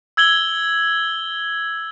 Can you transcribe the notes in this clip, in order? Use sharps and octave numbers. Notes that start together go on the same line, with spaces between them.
E6 G#6 F#7 G7